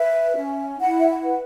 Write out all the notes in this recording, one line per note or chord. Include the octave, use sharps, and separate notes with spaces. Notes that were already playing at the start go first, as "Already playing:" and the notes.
Already playing: B4 E5
C#4
E4 F#5
E5
F#5
B4